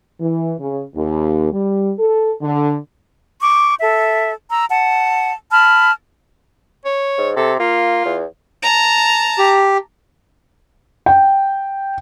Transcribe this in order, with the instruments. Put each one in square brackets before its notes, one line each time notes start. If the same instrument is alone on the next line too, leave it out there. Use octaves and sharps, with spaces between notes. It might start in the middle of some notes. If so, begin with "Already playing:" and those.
[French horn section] E3
C#3
D#2
G3
A4
D3
[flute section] C#6 D6
A4 E5
A#5 E6
F#5 A5
A5 B5 F6
[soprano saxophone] C#5
[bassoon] G#2
[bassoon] C3 [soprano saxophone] A4
[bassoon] A#3 [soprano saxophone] F4
[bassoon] E2
[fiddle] A5 A#5
[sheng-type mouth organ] G4
[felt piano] G5